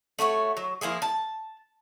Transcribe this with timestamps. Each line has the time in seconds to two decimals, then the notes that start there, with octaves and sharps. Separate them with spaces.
0.19 A3 F#4 G4 C#5
0.57 F#3
0.81 F3 A#3 E4 G#4
1.02 A5